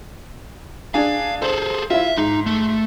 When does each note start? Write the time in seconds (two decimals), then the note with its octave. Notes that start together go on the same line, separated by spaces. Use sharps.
0.94 D4 G#4 F5
1.42 G#4 A4 C5
1.90 E4 F4 E5
2.18 G#2 D#4
2.46 A3